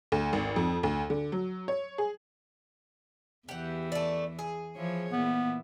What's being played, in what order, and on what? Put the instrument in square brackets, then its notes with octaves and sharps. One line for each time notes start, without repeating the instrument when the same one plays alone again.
[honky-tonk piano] D2
G#1
F2
D2
D3
F#3
C#5
G#4
[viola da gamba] E2 E3 [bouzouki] G4 F#5
[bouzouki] A3 D5
G#4
[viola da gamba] E3 F3 C#5
[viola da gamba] A#2 E3 [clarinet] B3